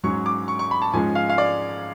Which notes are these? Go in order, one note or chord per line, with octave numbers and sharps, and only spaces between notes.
G#2 F#3 C#4 C#6
D6
C#6
C#6
B5
A5
G#2 F3 G#3 C#4 G#5
F5
F5
D5